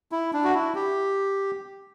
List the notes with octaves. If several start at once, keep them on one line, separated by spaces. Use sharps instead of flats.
E4
D4
F#4
E4
G4